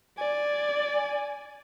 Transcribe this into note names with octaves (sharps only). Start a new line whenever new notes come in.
D5 G#5